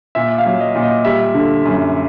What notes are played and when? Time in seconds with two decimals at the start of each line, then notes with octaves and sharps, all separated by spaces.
0.15 A#2 E5
0.38 F5
0.46 F#3
0.60 D#5
0.75 A#2
0.83 D#5
1.05 G3 E5
1.34 D3
1.65 F#2